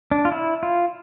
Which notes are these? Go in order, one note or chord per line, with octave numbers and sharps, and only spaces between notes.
D4
F4
E4
F4